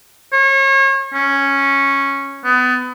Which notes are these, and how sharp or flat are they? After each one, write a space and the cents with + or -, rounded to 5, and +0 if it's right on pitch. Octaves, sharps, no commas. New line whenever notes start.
C#5 -35
C#4 -5
B3 +25